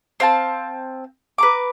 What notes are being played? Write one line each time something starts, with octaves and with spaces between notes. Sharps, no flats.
C4 F5 A5
B4 A#5 D6